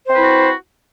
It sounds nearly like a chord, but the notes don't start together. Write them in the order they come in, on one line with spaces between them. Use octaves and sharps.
C5 C4 B4 E4 F#4